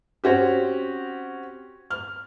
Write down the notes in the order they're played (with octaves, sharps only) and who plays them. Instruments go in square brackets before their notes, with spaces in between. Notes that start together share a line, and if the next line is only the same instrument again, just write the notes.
[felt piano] C4 C#4 F#4 G4
F6